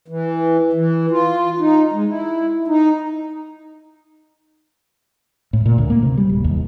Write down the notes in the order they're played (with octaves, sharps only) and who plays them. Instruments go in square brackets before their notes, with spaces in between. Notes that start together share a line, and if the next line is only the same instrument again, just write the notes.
[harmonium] E3
E3
F4
D#4
G#3
E4
D#4
[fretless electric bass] A2
A#2
D2
A#3
C3
G3
D1
D#2